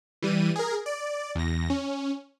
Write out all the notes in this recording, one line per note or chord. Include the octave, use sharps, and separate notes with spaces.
E3 G3 D#7
G#4 A#4
D5
E2 A#6
C#4